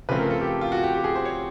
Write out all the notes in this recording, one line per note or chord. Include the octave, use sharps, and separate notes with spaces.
C#3 F3 A3 C4 B4
A#4
A4
G4
F4
F#4
G4
G4
G#4
C5
C#5